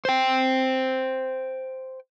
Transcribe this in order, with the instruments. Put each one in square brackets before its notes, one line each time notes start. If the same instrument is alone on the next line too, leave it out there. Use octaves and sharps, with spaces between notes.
[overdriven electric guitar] C5 G5